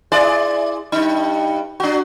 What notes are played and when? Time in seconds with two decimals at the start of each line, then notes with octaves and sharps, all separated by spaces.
0.12 E4 G#4 D5
0.92 G2 D#4
1.80 D4 F#4